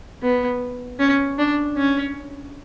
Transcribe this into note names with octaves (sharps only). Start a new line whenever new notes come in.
B3
C#4
D4
C#4